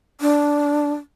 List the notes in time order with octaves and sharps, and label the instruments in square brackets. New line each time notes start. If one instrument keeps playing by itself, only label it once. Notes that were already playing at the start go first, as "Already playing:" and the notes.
[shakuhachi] D4